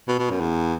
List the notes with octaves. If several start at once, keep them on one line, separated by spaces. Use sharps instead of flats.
B2
B2
F#2
E2